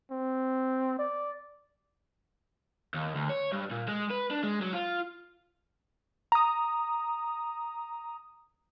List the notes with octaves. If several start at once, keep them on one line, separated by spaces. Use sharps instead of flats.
C4
D5
D#2
D2
C#5
G2
A#2
G#3
B4
D4
G#3
F#3
F4
A#5 D#6